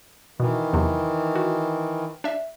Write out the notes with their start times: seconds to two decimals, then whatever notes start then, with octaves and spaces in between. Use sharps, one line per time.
0.40 B2 D#3 E3
0.73 E2 C3 F#3
1.35 F#4
2.24 D4 E5